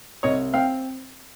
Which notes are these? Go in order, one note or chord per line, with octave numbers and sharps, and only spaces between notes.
C2 C#5 D#5
C4 F5 G5